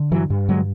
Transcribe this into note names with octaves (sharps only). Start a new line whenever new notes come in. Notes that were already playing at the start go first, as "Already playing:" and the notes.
Already playing: D3
G2 E3 F#3
G2
D3 F#3 G#3